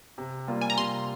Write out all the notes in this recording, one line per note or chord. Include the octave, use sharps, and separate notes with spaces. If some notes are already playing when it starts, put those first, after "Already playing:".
C3
G3 A#3 F4
G#5
A#5
C3 C6